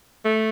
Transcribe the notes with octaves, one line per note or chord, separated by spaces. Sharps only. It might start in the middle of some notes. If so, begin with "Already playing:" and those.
A3